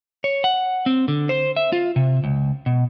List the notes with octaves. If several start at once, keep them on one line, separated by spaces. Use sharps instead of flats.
C#5
F#5
C4
D3
C5
E5
F4
C3
C#2
B2